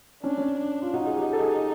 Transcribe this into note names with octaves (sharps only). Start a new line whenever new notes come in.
C#4 D4
C#4
D4
F4
D#4 F#4
G#4
G4
A4
G#4